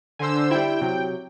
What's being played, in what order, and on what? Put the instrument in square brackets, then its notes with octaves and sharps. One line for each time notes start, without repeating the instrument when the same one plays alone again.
[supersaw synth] D3 C5 E6 [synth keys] G#5
[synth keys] G3 E4 [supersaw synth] G5
[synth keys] C3 F#3